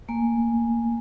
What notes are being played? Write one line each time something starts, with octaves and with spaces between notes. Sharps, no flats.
A3 A#3 G#5